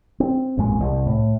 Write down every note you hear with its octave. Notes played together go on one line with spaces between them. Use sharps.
C4
A1 F#2 A#2 G#3
C2
A2